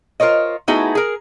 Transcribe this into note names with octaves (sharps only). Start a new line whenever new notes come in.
F4 A#4 C5 C#5 D#5
A3 B3 D#4 E4 F#4 G#4
G#4 A#4